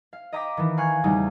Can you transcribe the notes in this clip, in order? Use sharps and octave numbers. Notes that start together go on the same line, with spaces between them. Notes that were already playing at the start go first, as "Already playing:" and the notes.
F5
D#5 G5 A#5 D6 D#6 B6
D#3 E3
F5 G#5 C#6 F#6 G#6
E2 C#3 G3 A3 D#4